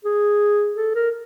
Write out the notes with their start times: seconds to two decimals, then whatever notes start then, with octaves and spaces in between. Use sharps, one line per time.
0.05 G#4
0.76 A4
0.95 A#4